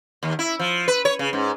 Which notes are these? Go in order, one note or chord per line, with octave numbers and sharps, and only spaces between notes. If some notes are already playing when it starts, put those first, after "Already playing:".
D#2
E4
F3
B4
C#5
C#3
G#2